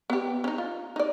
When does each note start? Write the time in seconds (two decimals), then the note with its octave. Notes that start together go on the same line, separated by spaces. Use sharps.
0.10 B3 G4
0.44 C#4 D#4
0.58 F4
0.96 D#4 D5